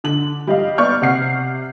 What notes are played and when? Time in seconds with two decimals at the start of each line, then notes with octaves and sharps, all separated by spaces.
0.04 D3 F#7
0.47 G3 D#5 F5
0.78 B3 D5 C#6 F6 G6
1.02 C3 F#5 C7